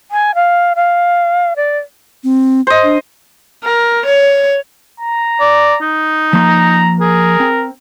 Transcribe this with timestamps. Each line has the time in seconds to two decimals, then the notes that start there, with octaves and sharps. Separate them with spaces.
0.11 G#5
0.35 F5
0.76 F5
1.56 D5
2.24 C4
2.67 C5 D#5
2.83 D4
3.64 A#4
4.06 C#5
5.00 A#5
5.40 D5
5.81 D#4
6.33 F3 A#3 A#5 C6
7.00 G#4 A#4
7.40 C4